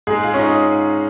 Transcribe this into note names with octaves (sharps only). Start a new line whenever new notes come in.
G#2 G#3 G#4
F4
C#4
D#4